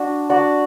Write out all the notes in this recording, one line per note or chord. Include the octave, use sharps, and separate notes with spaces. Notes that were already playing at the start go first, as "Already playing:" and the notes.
Already playing: D4 F#4
D4 F#4 D5